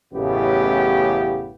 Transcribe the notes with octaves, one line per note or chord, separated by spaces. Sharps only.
A1 F#2 A2 C#3 B3 G4